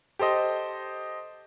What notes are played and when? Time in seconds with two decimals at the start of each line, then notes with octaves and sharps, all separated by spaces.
0.19 G4 A4 C5 D#5